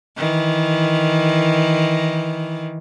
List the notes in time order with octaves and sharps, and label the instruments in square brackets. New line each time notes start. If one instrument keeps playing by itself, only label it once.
[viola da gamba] D#3 E3